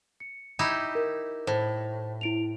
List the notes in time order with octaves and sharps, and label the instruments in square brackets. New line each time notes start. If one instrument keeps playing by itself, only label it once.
[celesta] C#7
[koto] D#4 E4 G4
[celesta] A#4
[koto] A2 [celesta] C5
[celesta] E4 D7 F7